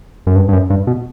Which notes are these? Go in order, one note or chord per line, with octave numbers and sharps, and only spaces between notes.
F#2
G2
G2
F#2
G2
B2